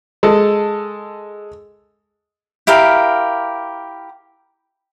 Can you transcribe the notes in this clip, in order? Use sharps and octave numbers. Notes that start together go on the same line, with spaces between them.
G#3 A4
E4 G4 A#4 F5